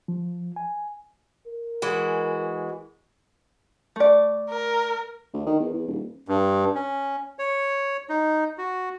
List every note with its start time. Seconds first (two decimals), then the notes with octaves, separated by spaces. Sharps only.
0.08 F3
0.56 G#5
1.47 A#4
1.82 E3 G#3 F#4
3.96 A3 D5
4.50 A#4
5.34 D2
5.47 D#3
5.60 E2
5.74 E2
5.88 D#1
6.28 G2
6.75 C#4
7.39 C#5
8.09 D#4
8.58 F#4